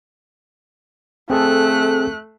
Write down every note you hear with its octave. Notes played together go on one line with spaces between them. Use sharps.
A3 C4 G#4 A4 F#6